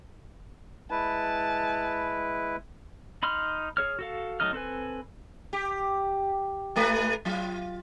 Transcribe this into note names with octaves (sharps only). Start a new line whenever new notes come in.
G#3 E4 B4 A5
D#4 B5 C6 F6
G#4 C#5 F6
F#4 A4 F5
F#3 A3 D#4 D#5 F6
C4 A4 B4 G#5
G4
G#2 A3 B4
F#3 F4